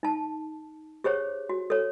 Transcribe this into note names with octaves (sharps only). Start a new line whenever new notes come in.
D#4 A5
G4 G#4 C5 C#5
F#4
A4 C#5